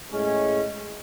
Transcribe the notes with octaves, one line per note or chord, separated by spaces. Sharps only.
A2 G#3 C#4